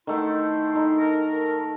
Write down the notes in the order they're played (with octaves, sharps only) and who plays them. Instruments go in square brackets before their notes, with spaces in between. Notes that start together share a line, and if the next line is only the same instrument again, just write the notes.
[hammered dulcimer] D#3 A3 F#5 [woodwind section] E4 G5 C6
[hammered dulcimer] D#4 A4
[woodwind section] A#4